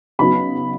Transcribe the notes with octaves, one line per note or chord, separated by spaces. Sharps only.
C#3 F#3 B3 D#4 F#4 B5